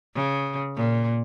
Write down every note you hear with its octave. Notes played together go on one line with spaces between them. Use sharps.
C#3
A#2